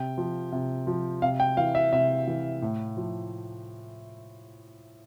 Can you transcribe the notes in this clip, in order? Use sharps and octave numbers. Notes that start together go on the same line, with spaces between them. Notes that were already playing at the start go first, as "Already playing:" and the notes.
Already playing: C3 G5
F3
C3
F3
C3 F5
G5
E3 F5
E5
C3 E5
E3
A2
F3